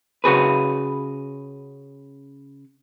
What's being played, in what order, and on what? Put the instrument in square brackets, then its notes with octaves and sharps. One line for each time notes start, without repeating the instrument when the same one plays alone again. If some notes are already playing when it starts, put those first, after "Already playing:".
[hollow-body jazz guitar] C#3 F#4 G#4 B4